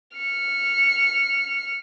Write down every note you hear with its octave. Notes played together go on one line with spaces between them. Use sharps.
F6 C#7